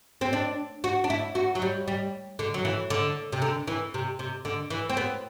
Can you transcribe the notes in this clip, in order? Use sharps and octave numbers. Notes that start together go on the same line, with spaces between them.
C4
D4
F#4
D4
E4
F#4
F#3
G3
G3
D3
F#3
E3
D3
C3
D3
E3
C3
C3
D3
E3
C4
B3